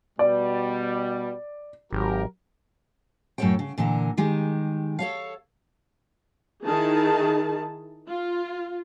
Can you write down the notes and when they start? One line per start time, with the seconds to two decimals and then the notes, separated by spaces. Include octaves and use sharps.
0.19 B2 G3 D5
1.93 G#1 F#3 G4 A#4
3.38 F#2 A2 C3 A4 C#5 G5
3.59 C#3
3.78 A#2 D3 E3 A#4
4.17 D#3 G#3 G4
4.99 A4 C#5 F5
6.66 D#3 E4 G#4 A5
8.08 F4